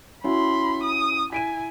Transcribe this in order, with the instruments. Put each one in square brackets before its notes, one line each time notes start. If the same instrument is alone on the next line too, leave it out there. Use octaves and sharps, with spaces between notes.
[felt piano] C#4 E4 F#4 [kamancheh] B5 C6
[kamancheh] D#6
[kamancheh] E4 G#5 [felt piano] B6 D7 D#7